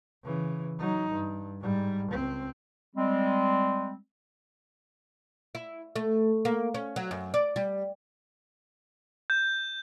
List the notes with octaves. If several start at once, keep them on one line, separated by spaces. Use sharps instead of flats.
C#3 E3
F#3 D#4
G2
G#2 G3
C#2 C4
G3 G#3 C4
E4
A3
A#3
C#4
F#3
F#2
D5
G3
G6